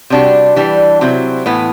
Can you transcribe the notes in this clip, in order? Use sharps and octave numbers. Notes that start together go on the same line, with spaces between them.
C3 G3 D4 F#4
E3 G3 D4
C3 F#3 C4 E4
A2 E3 B3